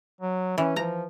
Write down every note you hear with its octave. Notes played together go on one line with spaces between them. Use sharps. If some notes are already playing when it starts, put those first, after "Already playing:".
F#3
E3 C#4
F3 A#5